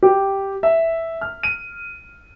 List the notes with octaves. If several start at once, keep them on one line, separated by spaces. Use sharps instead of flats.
G4
E5
F6
D#7